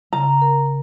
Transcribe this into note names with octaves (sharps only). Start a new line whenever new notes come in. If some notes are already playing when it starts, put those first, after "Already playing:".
C#3 A#5
A#4